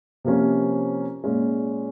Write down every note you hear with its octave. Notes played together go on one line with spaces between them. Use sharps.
C3 F3 A#3 C#4
A#2 G#3 C#4